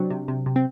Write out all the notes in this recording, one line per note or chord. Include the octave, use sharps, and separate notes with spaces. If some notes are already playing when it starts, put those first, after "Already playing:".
Already playing: C3 F#3 C4 D4
C3
C3
C3
C4